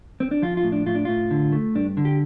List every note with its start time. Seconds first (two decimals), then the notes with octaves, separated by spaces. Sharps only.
0.20 C4
0.31 D4
0.42 F3 F4
0.57 F4
0.64 A2
0.72 D4
0.86 A2 F4
0.95 D4
1.05 A2 F4
1.31 D3
1.52 A3
1.75 G2 D4
1.97 D3
2.05 G4